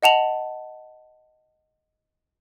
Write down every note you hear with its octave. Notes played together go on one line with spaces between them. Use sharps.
D#5 F#5 A5 F7 F#7